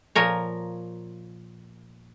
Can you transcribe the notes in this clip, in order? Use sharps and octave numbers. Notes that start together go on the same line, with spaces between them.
A#2 F3 A#4 C#5